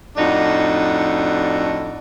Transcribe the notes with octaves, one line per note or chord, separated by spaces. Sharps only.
F2 A2 D4 D#4 F#4